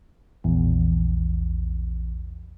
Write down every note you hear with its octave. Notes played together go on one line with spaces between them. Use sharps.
A#1 E2